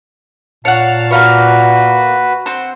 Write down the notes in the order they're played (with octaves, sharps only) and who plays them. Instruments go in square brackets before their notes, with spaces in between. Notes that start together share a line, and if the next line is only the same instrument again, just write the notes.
[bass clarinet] A#2 [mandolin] C#5 F#5 [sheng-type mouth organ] F5 A5
[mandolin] A#3 F5 C#6 [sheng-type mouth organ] F#4 B4
[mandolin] C4 C5 [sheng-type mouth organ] F#5